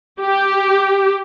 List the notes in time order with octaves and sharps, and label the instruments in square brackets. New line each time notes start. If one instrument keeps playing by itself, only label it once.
[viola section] G4